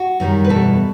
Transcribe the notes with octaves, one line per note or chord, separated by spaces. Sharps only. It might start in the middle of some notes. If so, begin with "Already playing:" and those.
Already playing: F#4
F#2 D#3 G3
B4
E2 B2 G3 A4